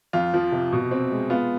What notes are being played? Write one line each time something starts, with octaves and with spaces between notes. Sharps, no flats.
F2 F4
F3
C3
B2
C4
G#3
B3 F4